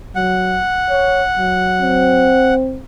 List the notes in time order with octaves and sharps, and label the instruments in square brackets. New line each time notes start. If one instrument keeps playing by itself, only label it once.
[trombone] F#3 [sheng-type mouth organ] F#5
[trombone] C#5
F#3
[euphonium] C4